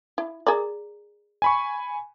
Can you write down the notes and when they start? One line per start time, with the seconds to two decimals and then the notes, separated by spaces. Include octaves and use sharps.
0.18 E4
0.47 G#4 A#4 D5
1.42 G#5 B5 C#6